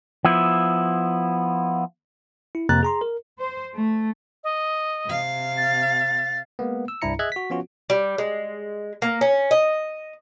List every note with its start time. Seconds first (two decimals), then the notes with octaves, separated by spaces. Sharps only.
0.25 F3 B3 E4
2.55 E4
2.69 F2 C3 A#3 A#5 F#6 A6
2.83 G#4 A#5 C6
3.01 A#4
3.39 C5
3.75 A3
4.44 D#5
5.06 C3 F5
5.57 A6
6.59 G#3 A#3 B3
6.88 E6
7.02 C2 G2 D4 E4 A#5 C#7
7.19 G#4 D#5 E5 F#6 G#6
7.32 F#4 B6
7.50 F3 B3 C#4 F4 F#4
7.90 G3
8.18 G#3
9.02 A#3
9.21 C#4
9.51 D#5